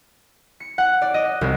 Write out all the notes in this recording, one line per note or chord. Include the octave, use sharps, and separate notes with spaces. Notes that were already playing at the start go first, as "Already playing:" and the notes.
C#7
F#5
D5
D#5
C2